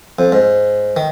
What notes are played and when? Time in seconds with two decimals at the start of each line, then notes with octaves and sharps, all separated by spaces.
0.19 F2
0.32 G#2
0.97 D#3